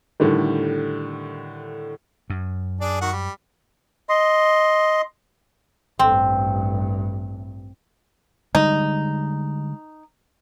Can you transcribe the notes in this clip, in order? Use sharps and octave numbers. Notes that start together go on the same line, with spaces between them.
A2 D3 D#3 G3
F#2
D4 G#4 D5
D#3 F#4 F#5
G3
D#5 C6
A1 G2 C4
D3 G3 G#3 D#4